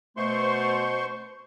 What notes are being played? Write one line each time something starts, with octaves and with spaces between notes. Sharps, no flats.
B2 A3 C5 C6 C#6